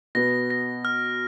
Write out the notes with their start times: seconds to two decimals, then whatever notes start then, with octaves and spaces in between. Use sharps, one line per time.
0.15 B2 B3 A#6
0.50 A#6
0.85 F6